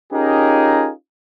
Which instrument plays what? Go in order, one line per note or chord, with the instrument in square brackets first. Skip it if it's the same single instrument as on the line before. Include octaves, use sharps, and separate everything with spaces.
[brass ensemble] C#4 D#4 F4 G4 G#4 A#4